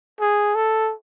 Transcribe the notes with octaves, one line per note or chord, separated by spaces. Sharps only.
G#4
A4